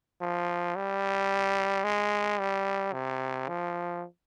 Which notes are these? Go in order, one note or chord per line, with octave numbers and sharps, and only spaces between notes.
F3
G3
G#3
G3
C3
F3